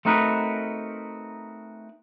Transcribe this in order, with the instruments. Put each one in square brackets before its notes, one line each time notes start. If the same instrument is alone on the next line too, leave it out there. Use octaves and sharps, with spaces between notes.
[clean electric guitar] A3 C4 D#4 F#4 A#4 B4